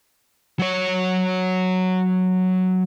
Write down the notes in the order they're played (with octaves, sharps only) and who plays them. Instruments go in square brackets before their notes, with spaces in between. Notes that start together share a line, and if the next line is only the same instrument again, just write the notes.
[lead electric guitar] F#3 C#5